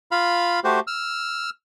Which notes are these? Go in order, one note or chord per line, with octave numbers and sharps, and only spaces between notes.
F4 F5 B5
A3 F#4 G4 C5
E6 F6